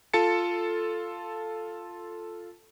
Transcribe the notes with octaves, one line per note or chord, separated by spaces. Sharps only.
F4 A4 A5 A6 C#7